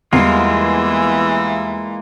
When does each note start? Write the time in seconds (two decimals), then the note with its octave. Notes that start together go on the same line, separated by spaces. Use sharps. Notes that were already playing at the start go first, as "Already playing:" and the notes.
0.13 E2 E3 G3 G#3 A#3 F4